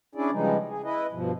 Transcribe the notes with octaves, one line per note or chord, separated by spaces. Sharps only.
C#4 D4 E4 G#4 D5
C#3 E3 F3 G3 G#3 D#4
G#4
E4 B4 D#5
G2 B2 F3